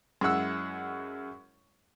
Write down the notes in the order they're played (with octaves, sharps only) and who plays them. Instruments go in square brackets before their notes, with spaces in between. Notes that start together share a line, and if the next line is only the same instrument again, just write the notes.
[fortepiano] F#2 G#3 E4 F#5 E6